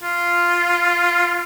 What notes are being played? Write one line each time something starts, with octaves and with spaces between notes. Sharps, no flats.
F4